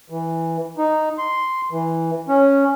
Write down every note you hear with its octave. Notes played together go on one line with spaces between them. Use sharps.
E3
D#4
C6
E3
C#4